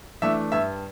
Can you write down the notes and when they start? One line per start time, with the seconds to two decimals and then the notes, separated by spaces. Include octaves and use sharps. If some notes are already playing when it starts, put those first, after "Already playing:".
0.22 E3 A3 D4 E5
0.52 G2 E5